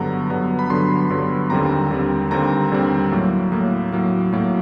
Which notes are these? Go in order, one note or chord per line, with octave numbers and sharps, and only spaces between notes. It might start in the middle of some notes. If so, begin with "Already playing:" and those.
Already playing: G2 D3 F#3 B3 A#5
G2 D3 F#3 B3
B5
G2 D3 F#3 B3 C6
G2 D3 F#3 B3
D#2 D3 G3 C4 A#5
D#2 D3 G3 C4
D#2 D3 G3 C4 A#5
D#2 D3 G3 C4
A2 F#3 A#3
A2 F#3 A#3
A2 F#3 A#3
A2 F#3 A#3